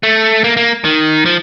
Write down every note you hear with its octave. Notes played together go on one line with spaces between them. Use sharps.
A3
A#3
A#3
D#3
F3